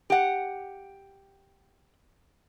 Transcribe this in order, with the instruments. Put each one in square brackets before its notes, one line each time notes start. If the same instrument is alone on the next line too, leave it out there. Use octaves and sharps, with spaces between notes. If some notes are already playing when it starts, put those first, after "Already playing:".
[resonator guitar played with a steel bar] G4 F#5